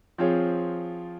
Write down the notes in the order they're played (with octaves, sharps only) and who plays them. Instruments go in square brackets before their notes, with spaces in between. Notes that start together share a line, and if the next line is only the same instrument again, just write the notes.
[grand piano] F3 C4 F4 G#4 C#5